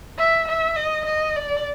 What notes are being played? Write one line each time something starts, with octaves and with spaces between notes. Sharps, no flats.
E5
E5
D#5
D#5
D5